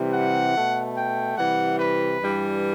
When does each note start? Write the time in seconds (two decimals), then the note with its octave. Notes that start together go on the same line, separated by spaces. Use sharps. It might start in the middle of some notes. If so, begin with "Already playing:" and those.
Already playing: C3 E3 G3
0.14 F#5
0.56 B2 A3
0.97 G5
1.38 C3 E3 G3 F#5
1.80 B4
2.21 G2 E3 G3